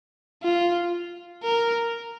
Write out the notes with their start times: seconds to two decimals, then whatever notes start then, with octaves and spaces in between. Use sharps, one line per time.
0.44 F4
1.43 A#4